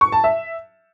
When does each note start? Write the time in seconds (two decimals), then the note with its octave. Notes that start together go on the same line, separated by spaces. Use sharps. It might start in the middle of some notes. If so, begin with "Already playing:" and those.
0.01 C#6
0.12 A5
0.24 E5